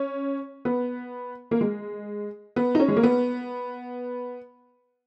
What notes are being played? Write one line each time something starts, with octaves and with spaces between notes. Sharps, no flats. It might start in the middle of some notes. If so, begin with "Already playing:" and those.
Already playing: C#4
B3
A#3
G#3
B3
D#4
C#4
G#3
A#3
B3